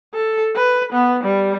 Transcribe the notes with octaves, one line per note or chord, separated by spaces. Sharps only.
A4
B4
B3
G3